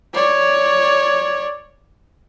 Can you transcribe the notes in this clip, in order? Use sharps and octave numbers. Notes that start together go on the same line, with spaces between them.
C#5 D5